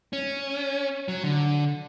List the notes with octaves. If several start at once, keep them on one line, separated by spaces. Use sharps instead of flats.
C#4
F#3
D3